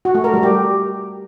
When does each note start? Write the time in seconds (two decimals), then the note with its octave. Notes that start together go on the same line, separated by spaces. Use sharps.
0.05 F#4
0.15 A3
0.24 A#4
0.34 G3
0.43 G4